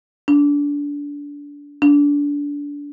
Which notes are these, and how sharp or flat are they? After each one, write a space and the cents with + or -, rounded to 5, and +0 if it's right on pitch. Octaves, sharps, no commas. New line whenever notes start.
D4 -25
D4 -25